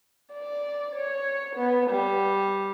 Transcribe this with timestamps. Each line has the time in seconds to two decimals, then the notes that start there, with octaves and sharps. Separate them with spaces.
0.33 D5
0.96 C#5
1.56 B3
1.90 G3